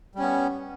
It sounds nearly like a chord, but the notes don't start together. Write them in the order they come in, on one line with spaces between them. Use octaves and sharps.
G3 C#4 B3